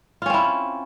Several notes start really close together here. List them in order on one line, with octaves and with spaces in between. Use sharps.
F4 C#4 C4 E4